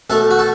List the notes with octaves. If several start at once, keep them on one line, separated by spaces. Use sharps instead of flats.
B2 A3 A4
F#4
A4